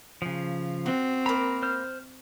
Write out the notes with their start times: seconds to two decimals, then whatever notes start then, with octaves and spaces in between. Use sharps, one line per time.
0.22 C#3 F3
0.86 C4 F#4
1.26 A#3 A#4 A#5 B5
1.62 C5 F6